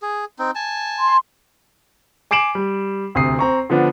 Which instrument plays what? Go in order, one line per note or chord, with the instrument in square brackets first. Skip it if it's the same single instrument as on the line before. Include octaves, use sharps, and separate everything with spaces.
[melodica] G#4
C4 D#4
G#5 A5
[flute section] C6
[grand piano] G#5 D6 C7 D7 E7 F#7
G3
D2 C3 D#6 C7
C4 A#5 C#6
D3 F3 B3 D4